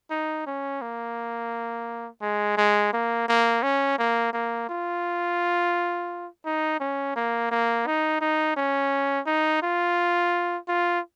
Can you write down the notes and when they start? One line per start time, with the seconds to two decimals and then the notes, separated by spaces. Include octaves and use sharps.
0.11 D#4
0.46 C#4
0.82 A#3
2.22 G#3
2.57 G#3
2.93 A#3
3.28 A#3
3.63 C#4
3.99 A#3
4.33 A#3
4.69 F4
6.45 D#4
6.80 C#4
7.16 A#3
7.51 A#3
7.87 D#4
8.21 D#4
8.57 C#4
9.27 D#4
9.62 F4
10.68 F4